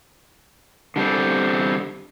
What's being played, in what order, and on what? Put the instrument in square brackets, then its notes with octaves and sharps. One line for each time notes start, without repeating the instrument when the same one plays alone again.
[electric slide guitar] D3 G3 C4